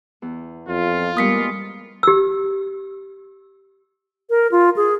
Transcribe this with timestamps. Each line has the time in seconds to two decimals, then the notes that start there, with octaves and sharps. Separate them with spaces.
0.22 E2
0.68 F2 F4
1.17 G3 G#3 A#3 B3 D#6 B6 C#7
2.03 G4 E6
4.30 A#4
4.52 F4
4.76 G#4